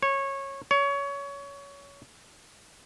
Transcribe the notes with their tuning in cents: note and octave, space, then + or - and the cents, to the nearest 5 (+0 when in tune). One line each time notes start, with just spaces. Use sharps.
C#5 -20
C#5 +20